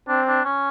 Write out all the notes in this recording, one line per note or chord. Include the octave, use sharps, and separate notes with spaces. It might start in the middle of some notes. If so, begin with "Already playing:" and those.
C4 D4
D4
C#4